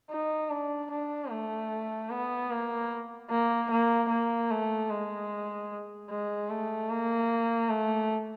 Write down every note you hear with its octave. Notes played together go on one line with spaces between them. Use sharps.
D#4
D4
D4
A3
B3
A#3
A#3
A#3
A#3
A3
G#3
G#3
A3
A#3
A3